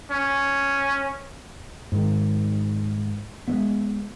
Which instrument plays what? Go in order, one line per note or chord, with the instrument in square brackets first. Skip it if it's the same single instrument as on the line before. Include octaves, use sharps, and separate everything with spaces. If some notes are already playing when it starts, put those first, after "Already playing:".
[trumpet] C#4
[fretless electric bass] G#2 D#3
G#3 A3 B3